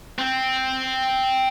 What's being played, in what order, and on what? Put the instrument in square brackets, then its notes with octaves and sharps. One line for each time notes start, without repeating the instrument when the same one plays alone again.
[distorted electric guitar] C4